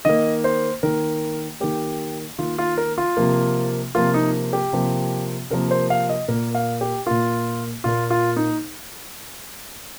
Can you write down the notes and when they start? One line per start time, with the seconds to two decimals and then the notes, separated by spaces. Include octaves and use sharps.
0.05 D#3 A#3 D#5
0.44 C5
0.83 D#3 A#3 A#4
1.60 D#3 A#3 G4
2.39 D#3 A#3 F4
2.58 F4
2.78 A#4
2.98 F4
3.17 C3 F3 A#3
3.95 C3 F3 A#3 F4
4.14 D#4
4.53 G4
4.73 C3 F3 A#3
5.50 C3 F3 A#3 A#4
5.71 C5
5.90 F5
6.09 D#5
6.28 A#2 A#3 A#4
6.55 F5
6.81 G4
7.06 A#2 A#3 F4
7.84 A#2 A#3 F4
8.10 F4
8.36 D#4